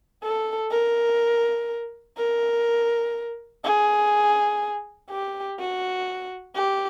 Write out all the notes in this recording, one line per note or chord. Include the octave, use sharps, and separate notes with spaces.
A4
A#4
A#4
G#4
G4
F#4
G4